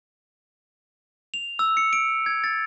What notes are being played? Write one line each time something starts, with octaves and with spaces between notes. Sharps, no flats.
F7
E6
C#7
D7
G#6
A6